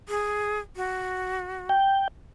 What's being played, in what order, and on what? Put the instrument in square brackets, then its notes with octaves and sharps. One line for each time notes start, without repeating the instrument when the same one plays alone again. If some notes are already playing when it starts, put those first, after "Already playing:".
[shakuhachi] G#4
F#4
[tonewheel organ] G5